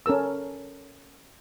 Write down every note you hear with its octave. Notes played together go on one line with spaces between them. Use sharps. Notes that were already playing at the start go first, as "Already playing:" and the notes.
C#4 A4 A#4 E6